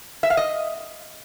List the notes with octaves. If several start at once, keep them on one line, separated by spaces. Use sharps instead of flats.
E5
F5
D#5